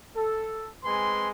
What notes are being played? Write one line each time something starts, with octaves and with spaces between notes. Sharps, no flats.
A4
G#3 C4 B4 G#5 C6